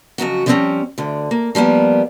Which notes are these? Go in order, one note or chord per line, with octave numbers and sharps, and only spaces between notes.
F2 C#3 F#3 F#4
D3 F3 G3 G#3 C4 C#4
D2 D3
A#3
F3 G3 A#3 B3